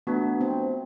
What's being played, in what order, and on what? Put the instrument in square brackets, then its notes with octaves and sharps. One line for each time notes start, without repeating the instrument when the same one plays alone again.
[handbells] A3 D4 F#4 [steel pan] B3
[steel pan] C4